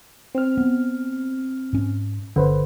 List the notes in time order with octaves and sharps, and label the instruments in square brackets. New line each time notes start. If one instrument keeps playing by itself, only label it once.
[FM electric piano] C4 F6
[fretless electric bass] B3
G#2 C#4
[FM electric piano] G1 B4 C5 [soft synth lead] D3 [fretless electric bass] C#4